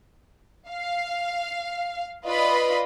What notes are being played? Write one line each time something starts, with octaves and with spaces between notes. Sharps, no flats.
F5
F4 B4 D5 D#5 F5 B5